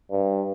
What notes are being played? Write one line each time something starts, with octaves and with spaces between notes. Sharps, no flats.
G2